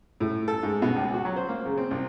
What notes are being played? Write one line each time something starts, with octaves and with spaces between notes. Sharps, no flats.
A2
A4
G#2
B2
C#2
F#4
F#3
C5
A#3
C#3
C4
C2